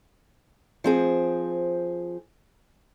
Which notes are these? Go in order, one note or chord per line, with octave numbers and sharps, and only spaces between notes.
F3 C4 G#4